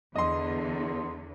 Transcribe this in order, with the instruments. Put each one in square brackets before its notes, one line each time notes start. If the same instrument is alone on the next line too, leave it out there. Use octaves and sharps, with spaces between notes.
[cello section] E2 D3 [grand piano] D#5 C6